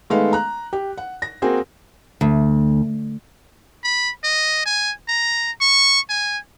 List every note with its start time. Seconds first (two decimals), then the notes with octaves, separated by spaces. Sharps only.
0.10 D#3 G#3 A3 B3 F5
0.33 A#5 F#6
0.73 G4
0.98 F#5
1.22 A#6
1.42 A#3 C4 F#4 G#4
2.21 D2
3.84 B5
4.24 D#5
4.66 G#5
5.08 A#5
5.61 C#6
6.09 G#5